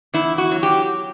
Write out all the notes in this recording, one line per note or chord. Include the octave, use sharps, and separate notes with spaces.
E2 E4
F#4
F#3
G4